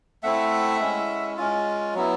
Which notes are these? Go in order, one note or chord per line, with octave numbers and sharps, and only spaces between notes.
A3 C4 E4 E5 F#5
G#3 C#4 E4
G#3 C#4 F4
F#3 B3 E4